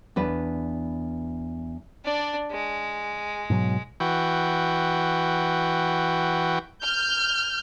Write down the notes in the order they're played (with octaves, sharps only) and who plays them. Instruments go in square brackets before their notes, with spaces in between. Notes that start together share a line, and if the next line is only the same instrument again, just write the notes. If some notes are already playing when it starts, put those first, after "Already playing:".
[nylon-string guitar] E2 D4 B4
[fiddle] D4 D5
G#3
[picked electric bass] G#2 B2 F#3
[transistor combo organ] E3 F#4 G5
[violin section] F6 G6